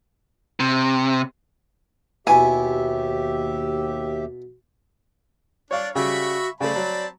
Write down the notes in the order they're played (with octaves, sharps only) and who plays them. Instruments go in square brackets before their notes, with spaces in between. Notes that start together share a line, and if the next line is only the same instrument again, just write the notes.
[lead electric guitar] C3
[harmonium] D#2 G4 E5 [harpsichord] B2 E4 [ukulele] G#5
[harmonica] D4 [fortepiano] C#5 F5 [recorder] D5
[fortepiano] C#3 G3 [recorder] F#4 [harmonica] E5 B5 C#6
[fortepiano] C#3 A3 [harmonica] C4 A5 B5 [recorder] D5
[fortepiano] F#3